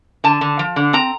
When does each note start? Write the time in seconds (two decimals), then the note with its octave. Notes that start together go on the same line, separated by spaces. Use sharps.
0.24 D3 A5
0.41 D3
0.59 F3
0.76 D3
0.93 C4 A#5